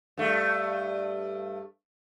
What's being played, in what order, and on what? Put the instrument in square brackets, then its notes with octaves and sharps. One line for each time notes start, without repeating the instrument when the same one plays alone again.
[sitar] G2 A3